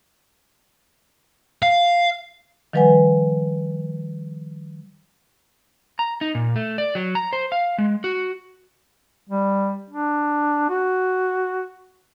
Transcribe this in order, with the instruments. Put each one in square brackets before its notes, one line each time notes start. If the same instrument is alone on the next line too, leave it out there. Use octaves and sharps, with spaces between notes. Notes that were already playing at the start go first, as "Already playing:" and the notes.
[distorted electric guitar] F5
[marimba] D#3 F3 G3 B4 F#5 G#5
[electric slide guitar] A#5
D#4
A#2
A3
D5
F#3
A#5
C5
F5
G#3
F#4
[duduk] G3
D4
F#4